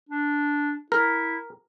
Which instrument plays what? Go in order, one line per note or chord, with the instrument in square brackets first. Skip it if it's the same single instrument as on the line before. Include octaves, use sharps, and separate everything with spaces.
[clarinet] D4
[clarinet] E4 [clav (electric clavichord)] A#4